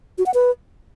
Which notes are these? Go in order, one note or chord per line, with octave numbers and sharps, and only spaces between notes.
F#4
F#5
B4